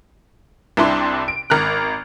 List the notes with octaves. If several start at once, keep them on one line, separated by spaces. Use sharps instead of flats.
C2 C3 D4 E4 C6
D7
G#1 A#4 A#5 F6 F#6